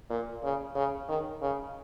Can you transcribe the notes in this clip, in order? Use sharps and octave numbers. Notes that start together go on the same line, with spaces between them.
A#2
C#3
C#3
D#3
C#3